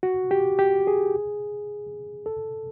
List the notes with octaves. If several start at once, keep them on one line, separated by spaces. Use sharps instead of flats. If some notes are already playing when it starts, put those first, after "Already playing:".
F#4
G4
G4
G#4
A4